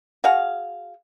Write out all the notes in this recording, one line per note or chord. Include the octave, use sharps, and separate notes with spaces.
F#4 G#4 F5